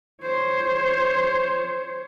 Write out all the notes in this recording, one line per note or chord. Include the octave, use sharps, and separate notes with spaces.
C5 C#5